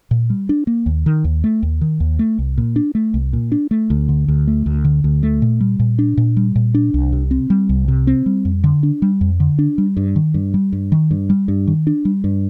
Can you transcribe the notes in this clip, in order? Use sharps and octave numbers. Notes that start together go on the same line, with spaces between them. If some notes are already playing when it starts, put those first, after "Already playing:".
A#2
G3
D4
A#3
D#2
D#3
D#2
A3
D#2
D#3
D#2
A3
C2
A#2
D4
A3
C2
A#2
D4
A3
D2
D3
D2
A3
D2
D3
D2
A3
A#2
G3
A#2
D4
A#2
G3
A#2
D4
C2
C3
C4
G3
C2
C3
C4
G3
F2
D3
D4
G3
F2
D3
D4
G3
G2
D#3
G2
G3
G2
D#3
G2
G3
G2
D#3
D4
G3
G2